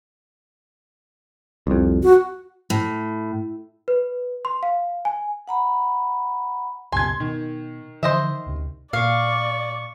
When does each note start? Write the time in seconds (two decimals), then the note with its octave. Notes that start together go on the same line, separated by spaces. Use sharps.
1.67 C2 F2
2.03 F#4
2.70 A2
3.88 B4
4.45 C6
4.63 F5
5.05 G#5
5.48 F#5 A#5 B5
6.92 C#2 F#2 B2 G#5 C6 G#6
7.20 B2 D#3
8.03 D3 E3 F3 C5 D#5 E5
8.46 D2 C3
8.93 A#2 D5 F5 C#6